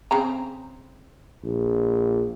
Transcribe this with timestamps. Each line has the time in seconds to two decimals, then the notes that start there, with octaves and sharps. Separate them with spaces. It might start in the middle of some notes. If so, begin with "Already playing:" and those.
0.11 C#3 C4 A#5
1.44 A#1